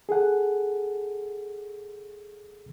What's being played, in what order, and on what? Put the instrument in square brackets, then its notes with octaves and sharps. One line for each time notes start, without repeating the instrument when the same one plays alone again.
[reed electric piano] G#4 A4 F#5